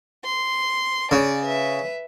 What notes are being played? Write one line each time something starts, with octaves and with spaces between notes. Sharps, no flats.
C6
C#3 D5
B4 E5